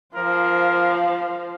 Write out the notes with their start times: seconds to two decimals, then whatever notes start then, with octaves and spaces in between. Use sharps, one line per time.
0.15 F3 A#4 C5 F5